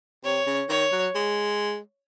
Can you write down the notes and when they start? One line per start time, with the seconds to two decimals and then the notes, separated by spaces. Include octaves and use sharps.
0.24 C3 C#5
0.47 C#3
0.69 D#3 C#5
0.92 F#3
1.15 G#3